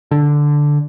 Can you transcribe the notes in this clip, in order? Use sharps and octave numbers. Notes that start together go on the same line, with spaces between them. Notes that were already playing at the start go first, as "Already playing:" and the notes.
D3